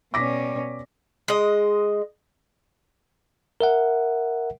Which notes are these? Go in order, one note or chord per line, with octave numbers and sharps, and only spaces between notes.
B2 G3 C#4 D6 A#6 B6
G#3 D#5
A#4 E5 F#5